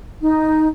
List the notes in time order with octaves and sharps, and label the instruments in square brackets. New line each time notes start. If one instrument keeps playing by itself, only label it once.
[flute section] D#4